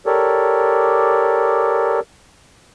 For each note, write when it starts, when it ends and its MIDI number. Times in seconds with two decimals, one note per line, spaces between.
0.06 2.00 67
0.06 2.00 69
0.06 2.00 70
0.06 2.00 73
0.06 2.00 74